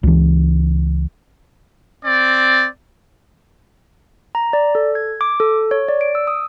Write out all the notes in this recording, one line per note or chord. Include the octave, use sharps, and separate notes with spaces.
C#2 E3
C4 D5
A#5
D5
A4
G#6
D6
A4
C#5
D5
D7
E6
D#6